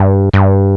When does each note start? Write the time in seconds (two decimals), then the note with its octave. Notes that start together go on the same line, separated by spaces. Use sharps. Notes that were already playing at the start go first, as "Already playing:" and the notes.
Already playing: G2
0.33 G2